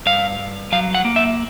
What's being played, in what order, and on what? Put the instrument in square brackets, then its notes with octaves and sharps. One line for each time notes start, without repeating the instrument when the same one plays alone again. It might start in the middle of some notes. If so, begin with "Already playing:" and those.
[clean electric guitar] G2 F5
G2
F#3 F5
F#5
A#3
E5